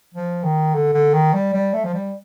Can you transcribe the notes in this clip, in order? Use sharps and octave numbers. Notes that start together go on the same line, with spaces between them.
F3
D#3
D3
D3
D#3
G3
G3
A3
F3
G3